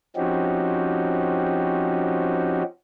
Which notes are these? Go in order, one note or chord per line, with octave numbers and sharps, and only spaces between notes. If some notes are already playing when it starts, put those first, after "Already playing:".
F3 C4 C#4 D#4 F#4 G4